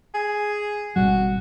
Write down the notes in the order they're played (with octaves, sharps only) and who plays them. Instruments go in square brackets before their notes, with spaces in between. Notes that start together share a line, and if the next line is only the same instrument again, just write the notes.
[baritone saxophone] G#4
[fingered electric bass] G#1 B2 G3 [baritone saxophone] F#4